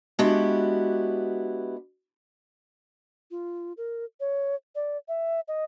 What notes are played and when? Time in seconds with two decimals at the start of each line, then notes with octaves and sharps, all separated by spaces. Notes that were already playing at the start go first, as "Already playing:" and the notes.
0.19 G#3 B3 D4 E4 F#4 G4
3.31 F4
3.77 A#4
4.20 C#5
4.75 D5
5.08 E5
5.48 D#5